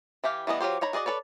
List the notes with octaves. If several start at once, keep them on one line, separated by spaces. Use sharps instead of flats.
E3 E4 G4 F5
E3 G3 B3 D#5
F#3 F4 G4 C5
D#3 C#5 A#5 B5
F#4 G#4 D5 D#5
A4 B4 C#5 D5